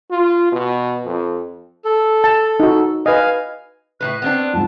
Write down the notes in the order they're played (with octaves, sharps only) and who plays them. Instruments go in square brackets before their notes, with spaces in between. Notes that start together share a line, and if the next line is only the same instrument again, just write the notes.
[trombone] F4
B2
F2
[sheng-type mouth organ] A4
[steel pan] A5
D#4 F#4
[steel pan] B4 D#5 [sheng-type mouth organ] F5 G#5
[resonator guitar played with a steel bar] A2 F3 B4 [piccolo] F#6
[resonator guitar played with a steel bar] B3 C4 D4
[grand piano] F2 G#2 [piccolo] A5